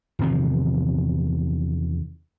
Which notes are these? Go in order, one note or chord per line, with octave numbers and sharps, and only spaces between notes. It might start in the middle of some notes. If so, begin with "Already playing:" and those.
E2 C3 D#3 F3